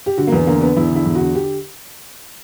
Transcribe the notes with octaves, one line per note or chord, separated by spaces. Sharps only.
G4
D3 F#4
A#3
E2 B3
D3 A#3
D3 B3
E2 E4
D3 E4
E2
D3 F#4
G4